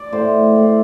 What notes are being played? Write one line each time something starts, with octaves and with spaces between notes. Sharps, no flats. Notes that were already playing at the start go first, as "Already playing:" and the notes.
Already playing: D5
A2 C5
A2